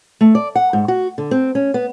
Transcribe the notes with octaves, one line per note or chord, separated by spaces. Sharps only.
A3
D5
F#5
G#2
F#4
D3
C4
C#4
B3